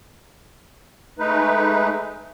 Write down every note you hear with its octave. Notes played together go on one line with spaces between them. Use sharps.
G#3 A3 D#4 B4